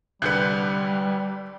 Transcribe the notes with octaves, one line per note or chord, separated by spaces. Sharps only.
C2 D3 G3 B4 F#6 G6 C#7